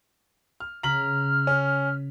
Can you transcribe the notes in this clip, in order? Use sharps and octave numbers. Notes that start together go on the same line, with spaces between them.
F6
C#3 A#5 F6 B6 F#7
C#4